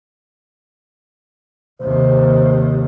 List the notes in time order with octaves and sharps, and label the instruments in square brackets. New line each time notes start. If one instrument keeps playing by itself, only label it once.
[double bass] D#2 C3 [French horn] C5